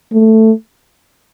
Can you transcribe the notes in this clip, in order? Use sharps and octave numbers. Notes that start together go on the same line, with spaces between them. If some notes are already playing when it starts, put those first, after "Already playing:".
A3